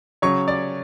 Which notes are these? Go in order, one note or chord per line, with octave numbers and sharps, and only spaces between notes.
C#3 F#3 C#5 C#6
D5 D6